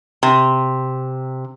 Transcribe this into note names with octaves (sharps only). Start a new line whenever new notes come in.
C3